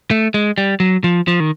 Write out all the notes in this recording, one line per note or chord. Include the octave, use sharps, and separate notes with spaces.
A3
G#3
G3
F#3
F3
F3
D#3